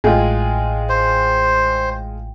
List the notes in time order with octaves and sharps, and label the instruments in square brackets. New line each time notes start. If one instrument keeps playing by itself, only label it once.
[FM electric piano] A1 A2 G5 [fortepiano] G#3 F4
[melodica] C5